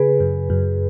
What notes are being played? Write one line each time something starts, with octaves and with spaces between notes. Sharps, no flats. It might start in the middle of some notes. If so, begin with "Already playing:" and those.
Already playing: C#3 G#4 B4
F#2
F#2